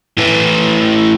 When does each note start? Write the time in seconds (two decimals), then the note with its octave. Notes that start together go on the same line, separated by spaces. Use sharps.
0.18 A2 E3